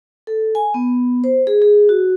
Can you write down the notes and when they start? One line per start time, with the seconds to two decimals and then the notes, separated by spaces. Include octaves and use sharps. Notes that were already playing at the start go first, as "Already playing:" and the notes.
0.27 A4
0.55 G#5
0.74 B3
1.24 C5
1.47 G#4
1.62 G#4
1.89 F#4